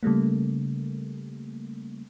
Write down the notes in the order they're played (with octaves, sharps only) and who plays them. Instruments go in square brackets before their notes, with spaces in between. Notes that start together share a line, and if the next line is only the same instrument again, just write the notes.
[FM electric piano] C#3 G3 A3 A#3